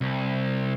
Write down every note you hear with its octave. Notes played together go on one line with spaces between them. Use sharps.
C2